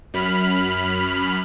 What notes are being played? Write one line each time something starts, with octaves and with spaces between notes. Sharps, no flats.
F#2 B5 F6